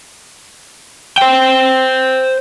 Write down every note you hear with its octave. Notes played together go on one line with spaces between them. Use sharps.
C5 G5